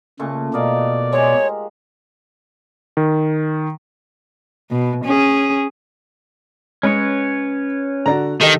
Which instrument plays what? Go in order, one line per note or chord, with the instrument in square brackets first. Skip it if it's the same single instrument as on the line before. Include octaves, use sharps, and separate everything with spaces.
[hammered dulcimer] A#2 A3 C#6 [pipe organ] C#3
[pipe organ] B2 D5 [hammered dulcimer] A#4 D#5 F5
[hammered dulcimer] G#3 G4 [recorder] C#5
[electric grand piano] D#3
[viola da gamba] B2
C#4 G#4
[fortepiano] G#3 [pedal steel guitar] C#4 B4 C#5
[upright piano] D3 F#4 [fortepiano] D5 A#5
[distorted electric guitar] D#3 [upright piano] G4 [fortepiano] A4 D#5